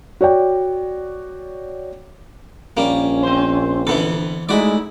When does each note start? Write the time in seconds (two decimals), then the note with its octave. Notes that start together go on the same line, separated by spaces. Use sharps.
0.21 F#4 C#5 D5 G5
2.77 A#1 G3 A#3 C#4
3.23 C4 C5
3.87 D3 E3 B3 A4
4.49 G#3 A3 D#4 E4 F#4 D5